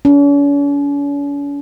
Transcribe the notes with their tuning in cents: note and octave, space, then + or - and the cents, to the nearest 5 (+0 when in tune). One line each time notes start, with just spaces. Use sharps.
C#4 +45